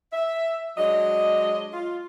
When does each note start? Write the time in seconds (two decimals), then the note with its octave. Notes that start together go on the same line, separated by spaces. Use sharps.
0.13 E5
0.78 F#3 G#3 D4 D#5
1.73 F4